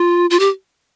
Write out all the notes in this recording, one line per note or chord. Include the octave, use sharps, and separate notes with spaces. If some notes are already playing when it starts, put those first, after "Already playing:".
Already playing: F4
F4
G4